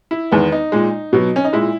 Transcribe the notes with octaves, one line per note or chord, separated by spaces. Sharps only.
E4
E2 D#3 G#3 B3
D#4
A#2 G#3
B2 F#3
C#4
D#4
A#2 G#3 E4